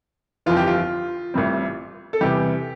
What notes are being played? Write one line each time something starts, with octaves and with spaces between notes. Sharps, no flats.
G1 F2 E3 F4
G4
F4
A1 A2 G3 C4
A4
E2 C3 E3 G3 G4